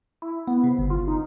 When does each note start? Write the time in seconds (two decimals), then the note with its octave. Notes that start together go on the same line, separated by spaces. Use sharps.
0.22 E4
0.47 B3
0.64 C3
0.79 G1
0.90 F4
1.08 D#4